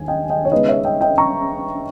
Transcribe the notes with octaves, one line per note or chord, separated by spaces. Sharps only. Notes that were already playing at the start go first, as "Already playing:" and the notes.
Already playing: D#2 G#5
D#5 G5
D#5 G5
C#5
C#3 G#3 B3 D#4 B4 D#5
C#5 E5
D#5 G5
D#5 G5
A#5 C#6